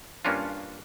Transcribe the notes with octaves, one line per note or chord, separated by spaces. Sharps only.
G2 A#3 C#4 D4 F4